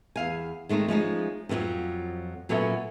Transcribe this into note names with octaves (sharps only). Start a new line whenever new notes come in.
E2 F5 G#5
D#3 G#3 A3 C4 D#4
F3 G#3 C#4 D#4
F2 C3 D#3 F3 F#3
A#2 F#3 B3 C#4 A4 E5